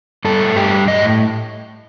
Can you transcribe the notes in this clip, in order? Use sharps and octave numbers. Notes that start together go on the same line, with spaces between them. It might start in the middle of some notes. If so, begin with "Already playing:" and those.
G2 A4
A3
G2 G4
G3
A2 D#5